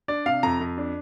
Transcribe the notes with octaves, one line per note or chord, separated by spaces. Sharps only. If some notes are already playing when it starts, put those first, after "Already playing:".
D4 D5
C3 F5
F2 A#5
F2
D4